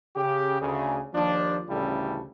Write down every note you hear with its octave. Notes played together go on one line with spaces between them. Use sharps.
C#3 G4
D2 C#3 G#4
D#2 F3 D4
A1 D2 C#3 G3 E4 A4